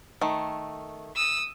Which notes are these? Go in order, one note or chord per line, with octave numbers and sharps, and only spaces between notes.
D#3 A3
D#6 E6